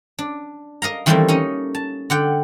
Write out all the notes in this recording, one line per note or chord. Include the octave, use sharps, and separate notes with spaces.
D4
A#4 D#5 F5 A#5
D#3 E3 G3 A3 A#3 C4
C#4 D#4 D#5
A5
D3 F#5 G5